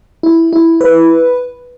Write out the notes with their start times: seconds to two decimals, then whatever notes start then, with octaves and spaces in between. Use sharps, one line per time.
0.23 E4
0.53 E4
0.81 B4